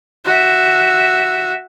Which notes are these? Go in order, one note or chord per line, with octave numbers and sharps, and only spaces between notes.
F#4 E5